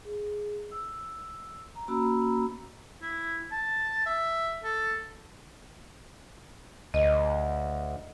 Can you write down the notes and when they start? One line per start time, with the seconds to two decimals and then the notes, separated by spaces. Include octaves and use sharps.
0.05 G#4
0.71 E6
1.75 A#5
1.88 A#3 C#4 F#4 A#5 B5 E6
3.02 E4
3.52 A5
4.06 E5
4.64 A4
6.94 D2 D#5